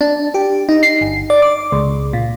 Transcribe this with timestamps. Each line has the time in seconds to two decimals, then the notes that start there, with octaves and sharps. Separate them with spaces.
0.01 D4
0.34 G4
0.69 D#4
0.83 C7
1.01 G1
1.30 D5
1.42 D6
1.72 C#2
2.13 A#2